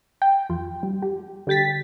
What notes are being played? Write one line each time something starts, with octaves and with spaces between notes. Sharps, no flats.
G5
F2 F4
G3
G4
D3 G3 G5 A6 B6